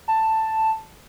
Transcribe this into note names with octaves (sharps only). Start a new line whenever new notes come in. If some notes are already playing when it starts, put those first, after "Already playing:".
A5